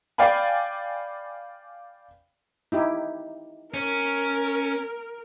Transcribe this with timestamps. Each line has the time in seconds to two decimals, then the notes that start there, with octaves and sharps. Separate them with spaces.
0.18 D5 F5 G5 G#5 B5
2.72 D#4 E4 G4
3.74 C#4 A#4